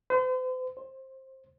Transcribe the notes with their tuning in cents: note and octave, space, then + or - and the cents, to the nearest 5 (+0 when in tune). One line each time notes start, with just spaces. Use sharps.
C5 -45
C5 +15